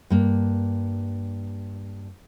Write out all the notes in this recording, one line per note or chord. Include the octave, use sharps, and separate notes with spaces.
G2 A#3